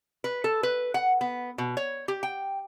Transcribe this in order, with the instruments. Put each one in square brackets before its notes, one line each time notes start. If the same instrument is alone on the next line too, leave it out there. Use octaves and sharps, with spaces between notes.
[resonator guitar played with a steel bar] B4
A4
B4
F#5
B3
B2
C#5
G4
G5